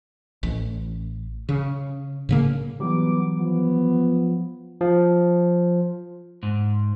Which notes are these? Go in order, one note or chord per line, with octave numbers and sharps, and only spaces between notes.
A1
C#3
A2 C#3 A#3
E3 F#3 G3 B3 D6
F3 B3
F3
G#2